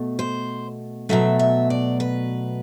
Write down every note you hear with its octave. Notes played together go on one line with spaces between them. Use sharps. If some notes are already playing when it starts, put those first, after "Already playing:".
Already playing: B2 A3
C5
B2 F#3 A3 E5
E5
D5
B4